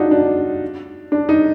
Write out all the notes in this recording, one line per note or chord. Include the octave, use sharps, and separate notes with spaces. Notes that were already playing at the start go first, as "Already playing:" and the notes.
Already playing: D4 D#4 F4 F#4
D4
D4
D#4